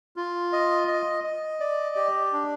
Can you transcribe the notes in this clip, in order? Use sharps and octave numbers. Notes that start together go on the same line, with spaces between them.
F4
D#5
D#5
D#5
D5
G4
D4